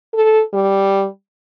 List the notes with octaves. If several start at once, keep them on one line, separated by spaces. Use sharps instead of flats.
A4
G3